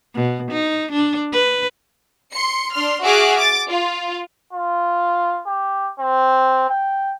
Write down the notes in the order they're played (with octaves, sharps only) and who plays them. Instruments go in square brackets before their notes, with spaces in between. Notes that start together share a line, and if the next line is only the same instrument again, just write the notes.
[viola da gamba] B2
D#4
D4
B4
[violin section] C6 C#7
D4 C6 F6
F#4 G#4 E5 D6 F6 F#6
D6 A6
F4
[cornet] F4
G4
C4
G5